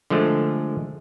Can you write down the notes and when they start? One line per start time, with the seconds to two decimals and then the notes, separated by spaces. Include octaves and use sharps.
0.10 D3 F3 G#3 A3